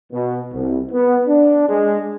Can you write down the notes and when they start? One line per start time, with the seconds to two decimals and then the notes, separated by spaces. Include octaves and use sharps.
0.12 B2
0.52 C2
0.92 B3
1.28 D4
1.69 G#3